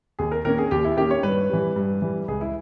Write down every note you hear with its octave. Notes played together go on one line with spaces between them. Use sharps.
D#2 G#4
A#4
D#3 A#3 C#4 A#4
G#4
D#2 G4
E4
D#3 A#3 C#4 G4
C#5
G2 B4
E3 G3
G2
E3 G3
C#2 G#4
E4